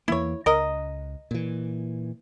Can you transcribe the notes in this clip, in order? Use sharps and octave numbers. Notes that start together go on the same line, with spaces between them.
E2 E3 A#3 E4 C#5
C#2 A#4 D#5
A#2 E3